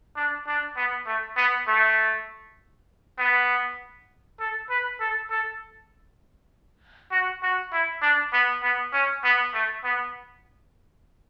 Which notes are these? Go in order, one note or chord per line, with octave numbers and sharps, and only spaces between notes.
D4
D4
B3
A3
B3
A3
B3
A4
B4
A4
A4
F#4
F#4
E4
D4
B3
B3
C#4
B3
A3
B3